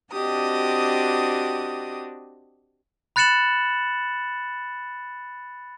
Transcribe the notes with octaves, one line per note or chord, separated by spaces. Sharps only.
C4 D4 F#4 G4 D#5 D#6
B5 F#6 A6 C#7 E7 F#7